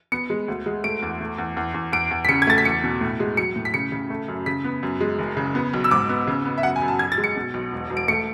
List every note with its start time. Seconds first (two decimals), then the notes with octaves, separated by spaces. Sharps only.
0.12 B3 C#7
0.30 G#3
0.48 D2
0.66 G#3
0.84 A3 D7
1.02 E2
1.20 A3
1.38 E2
1.57 E2
1.74 E2
1.92 E2 D7
2.11 E2
2.25 B6
2.29 C#3 C#7
2.42 G#6
2.47 A3 A6
2.58 B6
2.65 E2 C#7
2.84 B2
3.01 A2
3.20 G#3
3.37 F#3 C#7
3.56 A2
3.65 B6
3.74 C#3 C#7
3.92 C#3
4.10 A3
4.28 F#2
4.46 C#3 B6
4.64 B3
4.83 F#2
5.00 G#3
5.19 F#1
5.37 C#3
5.55 B3
5.74 B1
5.84 E6
5.91 G#2 D6
6.09 B3
6.27 C#3
6.46 B3
6.58 E5
6.63 F#2 F#5
6.76 G#5
6.82 F#2
6.88 A5
6.99 B1 G#6
7.12 A6
7.18 G#3
7.24 C#7
7.36 B2
7.54 B1
7.72 E1
7.90 E1
7.97 D7
8.08 A3 C#7